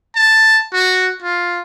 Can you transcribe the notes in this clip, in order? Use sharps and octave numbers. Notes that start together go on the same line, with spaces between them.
A5
F#4
F4